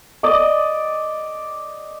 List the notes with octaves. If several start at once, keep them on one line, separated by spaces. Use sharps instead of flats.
D5 D#5 D6